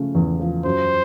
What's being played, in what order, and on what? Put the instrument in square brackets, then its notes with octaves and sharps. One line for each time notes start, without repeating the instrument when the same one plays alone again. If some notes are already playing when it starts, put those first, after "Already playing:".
Already playing: [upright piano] C#3 F3 A3
E2
F3
[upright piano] F#2 [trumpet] C5